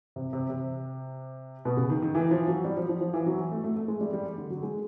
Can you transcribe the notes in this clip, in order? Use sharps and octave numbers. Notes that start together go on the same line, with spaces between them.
C3
C3
C3
B2
C#3
D#3
D#3
E3
F3
F#3
G3
F3
F3
F3
E3
F#3
A3
A3
A3
G#3
G3
G3
D3
F#3
G#3